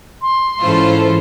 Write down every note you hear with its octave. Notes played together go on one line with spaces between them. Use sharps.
C6
G#2 E3 C#4 E4 F4 A4 C5